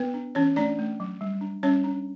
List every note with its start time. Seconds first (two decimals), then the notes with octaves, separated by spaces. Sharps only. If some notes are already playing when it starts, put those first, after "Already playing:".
Already playing: B3 B4
0.14 D4
0.35 E3 C#4 C#5
0.56 A3 D4 D5
0.79 A3
1.00 F#3
1.21 G3
1.41 D4
1.63 G3 C#4 C#5
1.84 D4